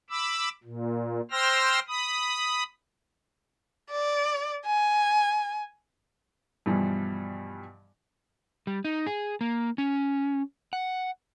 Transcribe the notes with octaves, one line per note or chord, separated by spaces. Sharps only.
B5 D6 E6
A#2
C5 G5 C6 E6 F6 A#6
B5 D#6
D5
G#5
G2 B2 E3 F3 G3
G3
D#4
G#4
A#3
C#4
F#5